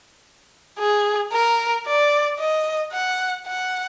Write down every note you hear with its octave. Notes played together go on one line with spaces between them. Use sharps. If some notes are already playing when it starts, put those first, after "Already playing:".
G#4
A#4
D5
D#5
F#5
F#5